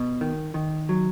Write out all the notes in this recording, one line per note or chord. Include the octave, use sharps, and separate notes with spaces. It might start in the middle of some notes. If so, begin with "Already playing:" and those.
Already playing: B2
D#3
D#3
F#3